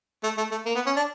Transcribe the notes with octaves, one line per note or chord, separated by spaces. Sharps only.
A3
A3
A3
A#3
B3
C#4
D4